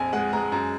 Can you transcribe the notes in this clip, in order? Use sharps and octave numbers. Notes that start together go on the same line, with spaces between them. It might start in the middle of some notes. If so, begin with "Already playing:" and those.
Already playing: A#1 F2 G#5
G#3 F#5
G#3 A#5
F#2 A#5